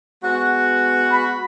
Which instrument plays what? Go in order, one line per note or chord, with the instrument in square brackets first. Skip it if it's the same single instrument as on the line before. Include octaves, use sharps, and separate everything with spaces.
[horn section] G#3 B3 F#4
[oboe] B5